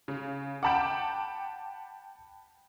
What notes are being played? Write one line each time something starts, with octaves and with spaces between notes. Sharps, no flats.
C#3
F#5 G5 A5 B5 D6